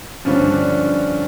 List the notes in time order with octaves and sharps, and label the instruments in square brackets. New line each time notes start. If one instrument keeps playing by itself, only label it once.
[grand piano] G2 D3 F3 C#4
D4